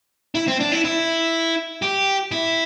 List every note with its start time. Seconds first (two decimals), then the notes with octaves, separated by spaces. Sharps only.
0.35 E4
0.47 C4
0.60 D4
0.72 E4
0.84 E4
1.82 G4
2.31 E4